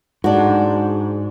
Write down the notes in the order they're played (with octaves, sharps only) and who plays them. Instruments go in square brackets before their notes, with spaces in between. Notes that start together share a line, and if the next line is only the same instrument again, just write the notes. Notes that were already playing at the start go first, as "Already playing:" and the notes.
[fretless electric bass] G#2 [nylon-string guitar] D4 F#4